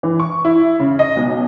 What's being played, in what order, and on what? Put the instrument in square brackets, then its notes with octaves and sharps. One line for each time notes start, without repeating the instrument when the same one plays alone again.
[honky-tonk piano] E3
C#6
E4
C#3
D#5
B1